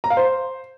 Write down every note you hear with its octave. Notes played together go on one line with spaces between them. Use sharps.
A#5
F5
C5